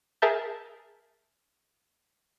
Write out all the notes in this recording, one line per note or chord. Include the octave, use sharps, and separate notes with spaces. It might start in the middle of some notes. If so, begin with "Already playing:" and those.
G#4 A#4 E5 A5 G6